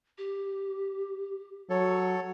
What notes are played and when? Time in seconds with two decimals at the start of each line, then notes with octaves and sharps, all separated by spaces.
0.18 G4
1.70 F#3 A4 C#5